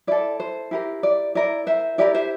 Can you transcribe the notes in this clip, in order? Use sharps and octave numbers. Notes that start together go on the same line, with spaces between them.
E4 A4 D5
C5
E4 G4 A#4
D5
E4 A#4 D5
C5 E5
E4 G4 A#4 D5
C5 E5